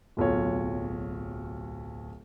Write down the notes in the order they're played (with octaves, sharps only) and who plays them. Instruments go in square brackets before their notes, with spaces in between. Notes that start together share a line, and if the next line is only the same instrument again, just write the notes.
[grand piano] D1 B1 F4 C#5